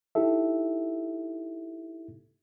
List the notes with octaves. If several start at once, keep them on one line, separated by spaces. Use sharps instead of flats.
D#4 E4 G4 A4 E5